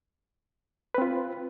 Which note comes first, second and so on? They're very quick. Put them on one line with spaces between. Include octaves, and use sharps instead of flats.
B4 C4 F4